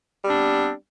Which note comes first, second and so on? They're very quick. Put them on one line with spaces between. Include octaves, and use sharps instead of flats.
G3 C4 D4 B3